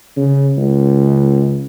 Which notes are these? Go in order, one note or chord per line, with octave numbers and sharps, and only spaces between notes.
C#3
C#2